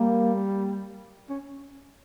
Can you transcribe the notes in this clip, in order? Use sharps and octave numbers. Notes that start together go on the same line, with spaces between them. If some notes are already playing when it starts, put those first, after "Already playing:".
Already playing: G3 A#3
C#4